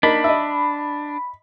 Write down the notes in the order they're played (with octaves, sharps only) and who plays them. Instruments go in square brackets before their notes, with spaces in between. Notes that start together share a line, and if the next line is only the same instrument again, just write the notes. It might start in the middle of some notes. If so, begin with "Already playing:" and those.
[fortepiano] A#3 D#4 [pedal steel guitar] D4 [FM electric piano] B5
[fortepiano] D#5 E5